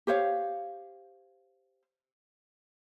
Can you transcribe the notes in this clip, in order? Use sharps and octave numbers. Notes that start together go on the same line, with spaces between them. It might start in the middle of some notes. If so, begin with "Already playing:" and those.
G4 C5 C#5 F5